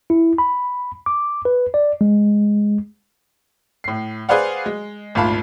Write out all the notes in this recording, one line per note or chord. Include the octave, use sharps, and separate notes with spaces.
E4
B5
D6
B4
D5
G#3
A2 C7
G#4 B4 C5 D5 F5 F#5
G#3
G#1 D2 A#2 F5 A5 B5